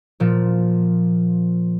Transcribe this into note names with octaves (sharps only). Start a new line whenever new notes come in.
A#2 F3